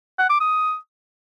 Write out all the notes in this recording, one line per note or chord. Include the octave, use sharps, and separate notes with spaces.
F#5
D6
D#6